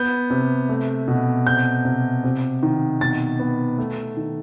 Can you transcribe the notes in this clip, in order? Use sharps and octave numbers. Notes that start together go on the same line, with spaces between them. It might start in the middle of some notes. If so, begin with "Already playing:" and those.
Already playing: B3 G6
C3
A3
B2
C3 G6
C3
C3
D#3
B2 A6
B3
A3
D#3